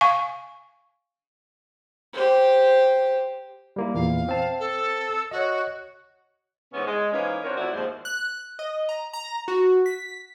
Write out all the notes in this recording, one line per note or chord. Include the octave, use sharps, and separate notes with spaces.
F5 G#5 C#6
G4 C5
G3 A#3 E4
E2 A#2 E3 F5
C4 A5
A4
F#4 C#5 D#5
G#2 C3 E3 B3 C#4
G#3
E3 F3 A#3 C#4 D#4
C4 D4 F#4 A#4 C#5
F2 A3 E4 F#4 D5
D#2 G#2 F3 C5
F#6
D#5
A#5
A#5
F#4
B6